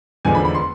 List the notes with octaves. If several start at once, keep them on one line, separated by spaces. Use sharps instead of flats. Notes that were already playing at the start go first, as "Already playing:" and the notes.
F1 E2 D3 F3 G#3 G#5
B5
B5
C6